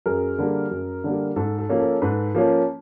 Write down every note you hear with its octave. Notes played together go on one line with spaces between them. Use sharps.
F#2 G#4 A#4
D3 G3 A#3
F#2
D3 G3 A#3
G#2 A4
A4
F3 A#3 C#4
A4
G#2 A4 B4
F3 A#3 C#4